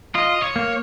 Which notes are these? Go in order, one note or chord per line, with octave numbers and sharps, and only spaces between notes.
F4 D#5
C#5
A#3